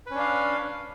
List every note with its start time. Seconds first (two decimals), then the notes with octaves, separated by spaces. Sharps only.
0.06 B4
0.11 C#4
0.15 D4
0.19 F5